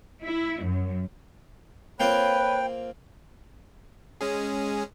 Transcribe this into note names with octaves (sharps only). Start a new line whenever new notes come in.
E4
F#2
A#3 C4 F4 B4 C#5 G5
G#3 C#4 G#4